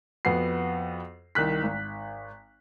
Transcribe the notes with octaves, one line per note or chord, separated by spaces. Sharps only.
F2 B3 F#4 C7
C2 D#3 F#6 B6
G#1